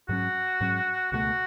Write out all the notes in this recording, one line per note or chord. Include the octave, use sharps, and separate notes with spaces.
G#2 F#3 C#4 F#4
G#2 F#3 C#4
C#2 B2 F#3 A3 F#4